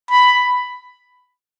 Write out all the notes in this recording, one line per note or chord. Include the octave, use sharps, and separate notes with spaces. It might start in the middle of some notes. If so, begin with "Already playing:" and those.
B5